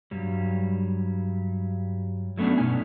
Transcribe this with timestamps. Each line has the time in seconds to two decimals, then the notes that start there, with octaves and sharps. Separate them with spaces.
0.11 G2 F#3 G3
2.38 F#3 A3 B3 C#4 D4
2.58 G2 B2 C#4 D#4 G#5